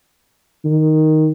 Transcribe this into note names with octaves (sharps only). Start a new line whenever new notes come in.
D#3